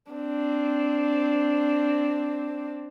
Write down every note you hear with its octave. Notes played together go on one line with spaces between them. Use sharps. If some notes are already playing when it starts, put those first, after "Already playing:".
C4 D4